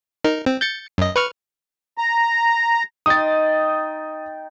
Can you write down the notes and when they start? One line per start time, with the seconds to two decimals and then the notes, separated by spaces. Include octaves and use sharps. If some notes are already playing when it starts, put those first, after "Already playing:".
0.24 D#4 A#4
0.46 C4
0.61 G6 A6 C#7
0.98 F#2 D#5
1.16 B4 C#6 F6
1.98 A#5
3.06 D#4 G5 C6 D#6 A6